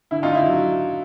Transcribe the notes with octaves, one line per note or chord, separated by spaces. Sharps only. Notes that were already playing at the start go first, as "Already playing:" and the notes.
D3 E4
D#4 F4
D3
E4
F#3